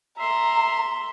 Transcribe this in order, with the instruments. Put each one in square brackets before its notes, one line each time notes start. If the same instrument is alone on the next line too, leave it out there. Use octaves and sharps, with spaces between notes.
[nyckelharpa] E5 C6 [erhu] A#5